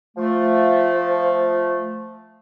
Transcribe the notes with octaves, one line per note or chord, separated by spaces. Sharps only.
F3 A3